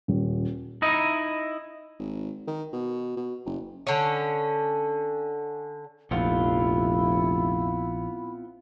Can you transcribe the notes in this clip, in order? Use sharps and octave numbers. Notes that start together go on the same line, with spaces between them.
D#1
D#4 E4 D#5
G#1
D#3
B2
B2
F#1
D3 C#4
F1 A#1 B3 C4 E4 F4